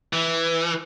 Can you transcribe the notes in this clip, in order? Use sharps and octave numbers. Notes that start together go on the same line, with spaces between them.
E3